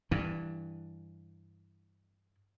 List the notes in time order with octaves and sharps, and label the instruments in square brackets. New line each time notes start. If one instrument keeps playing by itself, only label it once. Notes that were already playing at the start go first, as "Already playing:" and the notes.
[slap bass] G2 E3